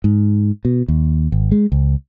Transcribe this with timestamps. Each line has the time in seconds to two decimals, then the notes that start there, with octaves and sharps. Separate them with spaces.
0.04 G#2
0.65 B2
0.88 D#2
1.32 G#1
1.52 G#3
1.72 C#2